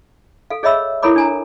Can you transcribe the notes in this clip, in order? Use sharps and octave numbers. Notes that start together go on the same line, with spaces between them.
A4 F5
G#4 C#5 D#5 E5 B5 E6
E4 A4 A#4 C#5 B5 D6
D4 G#5 A#5